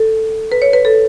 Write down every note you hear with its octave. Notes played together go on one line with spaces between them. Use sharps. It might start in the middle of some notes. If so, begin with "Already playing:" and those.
Already playing: A4
B4
C#5
B4
A4